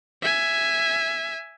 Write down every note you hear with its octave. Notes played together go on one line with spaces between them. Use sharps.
E5 G#5